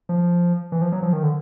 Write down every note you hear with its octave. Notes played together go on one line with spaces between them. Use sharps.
F3
E3
F3
F#3
F3
D#3
D3